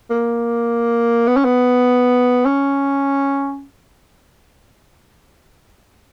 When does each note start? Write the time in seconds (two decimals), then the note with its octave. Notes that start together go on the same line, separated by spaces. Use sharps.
0.10 A#3
1.27 B3
1.36 C#4
1.45 B3
2.46 C#4